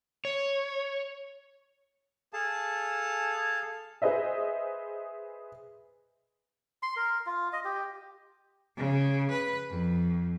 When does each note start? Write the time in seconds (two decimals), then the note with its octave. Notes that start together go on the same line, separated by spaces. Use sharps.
0.25 C#5
2.33 G#4 A4 F5 A5
4.02 G#4 B4 C5 D#5 E5
6.83 C6
6.97 A#4
7.26 F4
7.53 D#5
7.65 G4
8.77 C#3
9.31 B4
9.70 F2